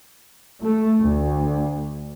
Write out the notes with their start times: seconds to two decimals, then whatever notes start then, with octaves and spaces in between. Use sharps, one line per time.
0.63 A3
1.03 D2